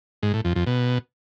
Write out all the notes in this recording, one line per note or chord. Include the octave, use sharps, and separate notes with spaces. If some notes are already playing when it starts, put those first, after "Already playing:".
G#2
A2
F2
F2
B2